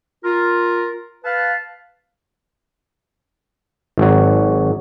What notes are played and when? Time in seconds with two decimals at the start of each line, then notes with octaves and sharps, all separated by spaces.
0.24 F4 A#4
1.24 B4 F5 A5
3.98 G#1 F#3